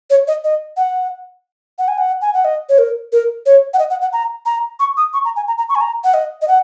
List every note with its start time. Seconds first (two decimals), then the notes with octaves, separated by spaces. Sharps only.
0.10 C#5
0.28 D#5
0.44 D#5
0.77 F#5
1.79 F#5
1.88 G#5
1.98 F#5
2.21 G#5
2.34 F#5
2.45 D#5
2.69 C#5
2.78 A#4
3.12 A#4
3.46 C#5
3.74 F#5
3.79 D#5
3.90 F#5
4.02 F#5
4.13 A#5
4.46 A#5
4.80 C#6
4.97 D#6
5.14 C#6
5.25 A#5
5.36 G#5
5.48 A#5
5.58 A#5
5.69 C#6
5.75 G#5
5.81 A#5
6.04 F#5
6.14 D#5
6.42 D#5
6.48 F#5